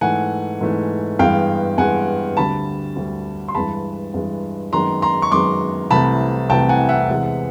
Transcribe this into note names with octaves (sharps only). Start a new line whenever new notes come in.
G#2 E3 A3 F#5 G#5
G#2 E3 A3
G2 E3 G#3 B3 F5 G5
G2 E3 G#3 B3 F#5 G#5
D2 D3 G3 A5 B5
D2 D3 G3
C6
G2 E3 G#3 A5 B5
G2 E3 G#3
F#2 D#3 G#3 B3 A#5 C6
A#5 C6
C#6
F#2 D#3 G#3 B3 C6 D6
C2 C3 E3 A3 A5 B5
C2 C3 E3 A3 G5 A5
F#5 G#5
E5 F#5
E2 C3 E3 G#3